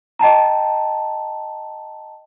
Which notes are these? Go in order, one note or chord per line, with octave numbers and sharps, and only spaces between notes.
D#5 G5 A5 A#5